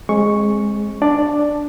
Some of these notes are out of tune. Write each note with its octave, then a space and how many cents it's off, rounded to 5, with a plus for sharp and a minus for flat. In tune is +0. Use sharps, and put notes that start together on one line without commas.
G#3 +0 C4 +35 C#6 +0
D4 +0 D5 +5